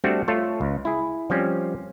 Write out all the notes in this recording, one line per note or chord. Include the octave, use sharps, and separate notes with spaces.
G3 A3 C4 D4 F#4
A3 F4 A4 C#5
C#2
E4 G#4
F3 G3 C4 C#4